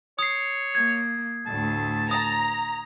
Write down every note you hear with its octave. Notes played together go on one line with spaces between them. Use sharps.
C#5 D#6 C7
A#3 G#6
D2 A2 A5
A#5 D#6